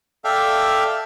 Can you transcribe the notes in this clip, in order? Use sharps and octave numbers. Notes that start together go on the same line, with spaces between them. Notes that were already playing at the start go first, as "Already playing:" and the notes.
A4 D5 E5 F5 G5